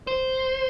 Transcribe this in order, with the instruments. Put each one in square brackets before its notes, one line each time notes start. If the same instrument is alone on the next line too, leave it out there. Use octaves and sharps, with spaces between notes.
[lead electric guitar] C5